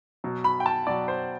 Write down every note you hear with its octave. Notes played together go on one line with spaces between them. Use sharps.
B2 F#3
B5
G5
A5
B2 F#3 D5
C5